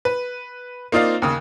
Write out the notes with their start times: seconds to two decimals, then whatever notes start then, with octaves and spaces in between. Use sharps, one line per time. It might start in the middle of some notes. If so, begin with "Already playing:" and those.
0.05 B4
0.92 A#3 C4 D#4 F4 D5 F5
1.22 D#2 C#3